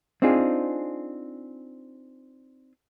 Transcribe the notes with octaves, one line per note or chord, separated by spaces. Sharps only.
C4 D4 D#4 F4 G#4